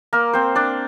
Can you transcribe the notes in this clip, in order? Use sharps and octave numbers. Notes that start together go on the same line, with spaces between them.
A#3 A#4
C4 C5
D4 D5